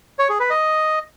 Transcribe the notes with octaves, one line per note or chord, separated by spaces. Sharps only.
C#5
G#4
B4
D#5